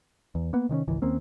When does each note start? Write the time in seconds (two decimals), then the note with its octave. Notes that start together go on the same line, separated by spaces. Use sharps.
0.35 E2
0.53 A#3 B3
0.69 C3 D#3 C4 C#4
0.88 G#1 C#2 E3
1.02 D#2 A#3 C4 C#4